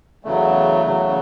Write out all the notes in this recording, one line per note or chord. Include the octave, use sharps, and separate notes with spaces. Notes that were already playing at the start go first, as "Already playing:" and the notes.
E2 C#3 F#3 A3
E2 C#3 F#3